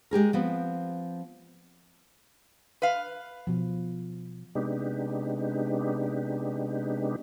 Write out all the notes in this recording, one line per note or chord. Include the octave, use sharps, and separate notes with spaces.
G#3 G4 G#4 A#4
F3 B3 C4
B4 F5
B2 F3
C3 G#3 B3 D4 D#4 G4